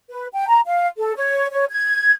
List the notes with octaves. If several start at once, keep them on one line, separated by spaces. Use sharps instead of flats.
B4
G5
A#5
F5
A4
C#5
C#5
G#6